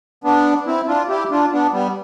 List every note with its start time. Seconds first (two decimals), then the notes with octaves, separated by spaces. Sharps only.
0.24 B3 D4
0.66 C4 E4
0.88 D4 F4
1.09 E4 G4
1.31 D4 F4
1.52 B3 D4
1.73 G3 B3